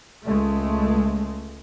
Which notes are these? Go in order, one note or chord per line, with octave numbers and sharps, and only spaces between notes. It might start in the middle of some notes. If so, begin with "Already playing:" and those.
C#2 G#3 A3